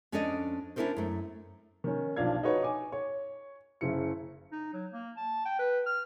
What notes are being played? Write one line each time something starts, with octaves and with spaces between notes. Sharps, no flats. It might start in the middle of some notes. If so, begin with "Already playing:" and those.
F2 C#4 D4 A4 D5 D#5
C#4 D4 E4 A4 A#4 C5
F#2 A3
D#3 C#4
B1 F3 D4 F5 G#6
D#4 F#4 B4 C#5
G#5 D6
C#5
F#1 C#3 E4 C#7
D#4
F#3
A#3
A5
G5
B4
F6